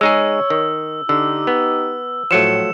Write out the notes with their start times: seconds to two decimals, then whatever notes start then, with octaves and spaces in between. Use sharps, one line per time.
0.01 G#3 D#4 G#4 C#5 E6
0.50 D#3
1.09 D3 D#4 G4 E6
1.47 B3
2.31 A2 F3 F#3 A3 C#7 E7